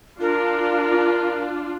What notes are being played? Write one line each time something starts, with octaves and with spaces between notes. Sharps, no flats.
D4 F4 A#4